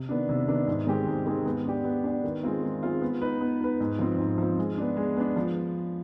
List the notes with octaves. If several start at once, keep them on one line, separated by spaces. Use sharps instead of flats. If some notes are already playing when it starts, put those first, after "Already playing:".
Already playing: C3
D#3 B3 D4
C3
D#3 B3 D4
G#2
D#3 G#3 C4 G4
G#2
D#3 G#3 C4 G4
B3
D4 G4
B3
D4 G4
D#3
G#3 C4 F4
D#3
G#3 C4 F4
B3
D#4 B4
B3
D#4 B4
G#2
F3 C4
G#2
F3 C4
G#3
B3 D4
G#3
B3 D4
F3